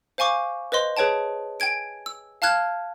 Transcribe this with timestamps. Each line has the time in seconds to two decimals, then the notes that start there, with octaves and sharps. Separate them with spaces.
0.18 C5 F5 G#5 C#6 D6
0.72 B4 C5 D#5 C6
0.97 G#4 B4 C#5 G5 A5
1.60 G5 G#5 G#6 D7
2.06 E6
2.42 F5 A5 F6 F#6 G#6